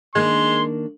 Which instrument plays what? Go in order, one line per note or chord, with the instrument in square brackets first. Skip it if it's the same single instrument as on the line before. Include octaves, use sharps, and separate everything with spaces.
[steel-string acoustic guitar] D#3 A#3 D4 [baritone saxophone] G#3 [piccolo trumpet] C6